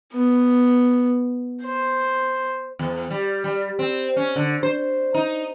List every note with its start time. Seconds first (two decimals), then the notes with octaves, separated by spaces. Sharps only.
0.13 B3
1.63 C5
2.79 E2
3.10 G3
3.44 G3
3.79 C4
4.17 C#4
4.36 D3
4.63 C5
5.14 D#4